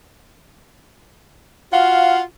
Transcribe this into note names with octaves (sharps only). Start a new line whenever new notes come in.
F4 F#4 F5 F#5